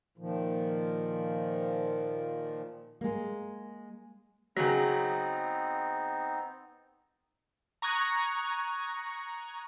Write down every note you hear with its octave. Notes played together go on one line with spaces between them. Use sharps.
A#2 D#3 F3
G#3 A#3
C#3 F#3 B3 C4 D#4
A#5 C#6 D#6 F#6 G#6